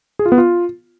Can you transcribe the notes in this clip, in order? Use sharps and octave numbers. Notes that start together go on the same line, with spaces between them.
G#4
F4
B3
F4